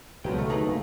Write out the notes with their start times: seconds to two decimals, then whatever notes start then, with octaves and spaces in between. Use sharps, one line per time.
0.24 C#2 B2 F3 F#3 G#3 B3 G5
0.38 D#3 A3
0.50 A3 D#4 G#4 B4 A#5
0.67 C#2 F#2 A#3